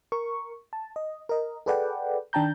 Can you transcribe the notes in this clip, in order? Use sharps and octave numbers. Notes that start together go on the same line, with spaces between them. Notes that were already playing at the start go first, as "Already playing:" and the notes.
A#4 C#6
A5
D#5
A#4 D#5
G#4 A4 B4 D5 F#5 G5
D#3 D4 G5 A5 A#5 G6